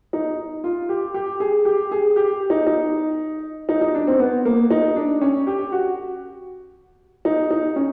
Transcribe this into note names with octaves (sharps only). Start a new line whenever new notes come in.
D#4
F4
G4
G4
G#4
G4
G#4
G4
D#4
D#4
D#4
D#4
D4
C4
B3
A#3
D#4
D4
C#4
G4
F#4
D#4
D#4
C#4